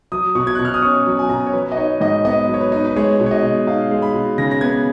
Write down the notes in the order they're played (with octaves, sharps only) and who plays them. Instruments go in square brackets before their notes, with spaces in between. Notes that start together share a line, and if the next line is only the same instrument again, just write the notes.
[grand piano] F#3 D#6
B2 C#6
G#6
B2 F#6
F6
D#6
C#4 C#6
F#3
G#5
B2 A#5
C#5
F#3 B4
D#5
D#4 C#5
G#2 D#5
B3 D#5
F#3
C#5
B4
D#4
B4
G#3 C#5
B2
C#5
D#5
B2
D#4 F5
G#3
B5
B2
C#3 A#6
A#6
B3 G#6